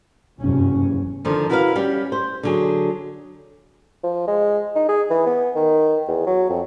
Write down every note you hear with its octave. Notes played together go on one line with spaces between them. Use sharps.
F#1 E2 G2 C3 C#4
D3 D#3 F3
E4 F#4 A#4 B4 C#5 F5
G3 C#4 G4
C5
D3 F#3 G#4
F3
G#3
D#4
G#4
E3
B3
D#3
E2
F#3
F2